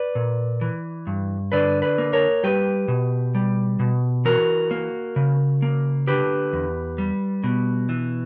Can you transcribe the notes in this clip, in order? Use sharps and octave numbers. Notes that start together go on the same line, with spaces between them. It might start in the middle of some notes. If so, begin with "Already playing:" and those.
Already playing: B4 D5
A#2
E3
G2
D3 B4 D5
B4 D5
A#3
A#4 C#5
G3 G4 B4
B2
G3
B2
E3 F#4 A#4
A#3
C#3
A#3
D3 G4 B4
E2
G3
B2
E3